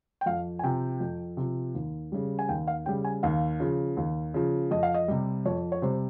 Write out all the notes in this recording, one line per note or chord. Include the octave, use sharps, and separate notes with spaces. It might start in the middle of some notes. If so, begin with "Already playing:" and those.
G5
F2 F5
G#5
C3 F3 G5
F2
C3 F3
D#2
C#3 G3
G#5
D#2 G5
F5
C#3 G3 G5
G#5
D#2 F5
C#3 F3
D#2
C#3 F3
F2 D#5
F5
D#5
C3 G3
F2 C#5
C#5
C3 G3 C5